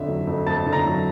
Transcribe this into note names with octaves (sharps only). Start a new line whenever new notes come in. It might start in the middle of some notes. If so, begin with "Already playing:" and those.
Already playing: F2 D3 E5
F#3
F2
F2 A5 A6
D3
A#5 A#6
F#3